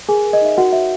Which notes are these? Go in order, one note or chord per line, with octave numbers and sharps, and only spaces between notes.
G#4 A#4 G#5
A#4
D#5
D#4 E5
F#4 A#4 F#5
C#5 E5